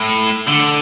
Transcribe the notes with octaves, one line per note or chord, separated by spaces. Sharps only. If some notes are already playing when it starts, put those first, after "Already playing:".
Already playing: A2
D3